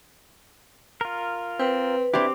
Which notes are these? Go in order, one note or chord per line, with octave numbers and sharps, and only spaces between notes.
F4 A#4
C4 B4
C4 D4 E4 G4